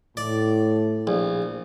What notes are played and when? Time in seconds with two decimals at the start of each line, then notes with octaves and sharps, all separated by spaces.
0.17 A2 D5
1.07 A#1